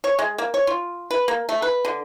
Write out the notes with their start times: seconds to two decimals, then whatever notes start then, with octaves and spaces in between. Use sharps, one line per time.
0.04 C#5
0.19 G#3
0.38 A#3
0.54 C#5
0.67 F4
1.11 B4
1.28 A#3
1.49 A3
1.62 B4
1.85 D3